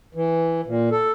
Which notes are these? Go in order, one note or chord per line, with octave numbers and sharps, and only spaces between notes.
E3
A#2
A4